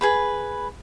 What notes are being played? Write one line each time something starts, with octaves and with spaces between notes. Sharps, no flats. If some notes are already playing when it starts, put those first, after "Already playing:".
G#4 B4 B5